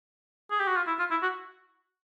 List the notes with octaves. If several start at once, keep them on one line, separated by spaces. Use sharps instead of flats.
G#4
G4
F#4
F4
E4
F4
E4
F#4